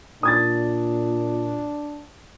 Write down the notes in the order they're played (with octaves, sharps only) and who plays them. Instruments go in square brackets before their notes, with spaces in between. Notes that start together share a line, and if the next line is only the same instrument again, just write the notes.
[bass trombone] A#2 [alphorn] D4 [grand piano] D#6 G#6 A6